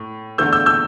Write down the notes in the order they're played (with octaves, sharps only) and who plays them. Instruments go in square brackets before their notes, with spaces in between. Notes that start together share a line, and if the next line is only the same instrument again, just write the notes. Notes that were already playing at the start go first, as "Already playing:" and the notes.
Already playing: [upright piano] A2
[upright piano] E2 D3 A3 [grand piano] E6 G6
[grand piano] E6 G6
E6 G6